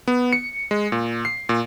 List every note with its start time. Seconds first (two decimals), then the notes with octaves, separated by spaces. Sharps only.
0.08 B3
0.33 C#7
0.71 G#3
0.92 A#2
1.25 C7
1.49 A#2